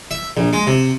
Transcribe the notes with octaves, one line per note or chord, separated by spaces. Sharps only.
E5
A#1
G#3
C3